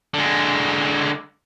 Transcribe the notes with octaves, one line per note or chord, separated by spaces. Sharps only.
D3 G#3